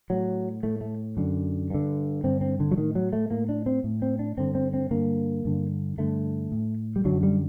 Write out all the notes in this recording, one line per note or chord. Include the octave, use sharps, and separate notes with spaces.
A2 F#3
A2 A3
A3
F#2 D3
G2 D3
G2 D3 C4
C4
D3
F#3
A2 D#3
F#3
A3
A2 A#3
D4
C4
A2
C4
D4
G2 D3 C4
C4
C4
G2 D3 A#3
G2 D3
G2 D3 A3
A2
G3
F#2 D3 F#3
G3